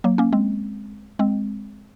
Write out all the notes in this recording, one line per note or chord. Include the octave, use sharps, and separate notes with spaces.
F#3 A#3
A#3 C#4
G#3 C4
G#3 C4